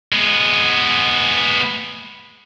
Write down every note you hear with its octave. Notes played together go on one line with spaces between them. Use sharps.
G#3 B3